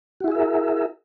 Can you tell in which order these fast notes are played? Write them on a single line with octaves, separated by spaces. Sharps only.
F#4 E4 G#4 E5 A#4